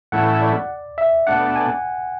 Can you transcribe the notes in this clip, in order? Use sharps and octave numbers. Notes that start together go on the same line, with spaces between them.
A2 E3 A3 C#4 E4 F#5
D5
E5
B2 A3 D4 F#5
G#5